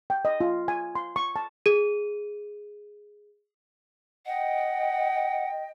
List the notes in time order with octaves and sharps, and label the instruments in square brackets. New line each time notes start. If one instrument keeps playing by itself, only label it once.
[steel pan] G5
D#5
F4
G#5
C6
C#6
A5
[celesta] G#4 D#7
[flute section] D#5 G5 [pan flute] F#5